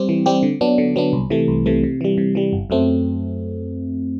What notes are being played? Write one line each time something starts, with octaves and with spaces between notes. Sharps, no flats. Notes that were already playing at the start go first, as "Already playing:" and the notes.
Already playing: G3 C4 G4
E3
G3 C4 G4
D3
F#3 B3 D4
D3
F#3 B3 D4
C2
C3 E3 A3
C2
C3 E3 A3
C3
E3 G3
C3
E3 G3
G1
F#2 F#3 A3 C4